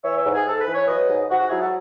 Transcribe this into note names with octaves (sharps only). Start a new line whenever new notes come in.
E3 C#5 E5
C#5 E5
G#2
G#4
G#2 A4
B4
E3
C#5
F#3 B4 D#5
G#2
G#2 F#4
F#4
F#3 E4 G#4
F#4 A4